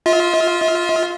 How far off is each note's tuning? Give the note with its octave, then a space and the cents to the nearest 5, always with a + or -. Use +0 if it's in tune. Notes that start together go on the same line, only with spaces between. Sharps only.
F4 +0 E5 -45